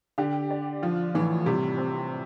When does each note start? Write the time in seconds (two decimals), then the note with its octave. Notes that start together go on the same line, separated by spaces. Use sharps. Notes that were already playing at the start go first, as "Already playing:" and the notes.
0.18 D3 G4
0.51 D5
0.82 F3 F4
1.14 A2 E3
1.46 C3 G3
1.78 C4